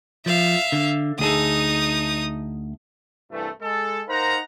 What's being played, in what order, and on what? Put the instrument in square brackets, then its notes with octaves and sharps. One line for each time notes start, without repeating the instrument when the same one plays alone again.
[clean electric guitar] F3 [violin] E5 F5
[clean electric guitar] D3
[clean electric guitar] D2 G#4 A4 [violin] D#4 D#6
[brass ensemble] C2 G2 E3 A3
G#3 A4
D#4 A#4 C5 F5 F#5 A#5